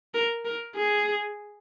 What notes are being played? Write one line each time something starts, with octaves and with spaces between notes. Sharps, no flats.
A#4
A#4
G#4